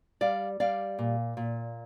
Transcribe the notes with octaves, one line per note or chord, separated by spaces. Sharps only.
G3 D5 F5
G3 D5 F5
A#2
A#2